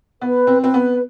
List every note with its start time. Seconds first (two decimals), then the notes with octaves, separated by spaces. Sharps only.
0.21 B3 B4
0.47 C4
0.61 C4 B4
0.74 B3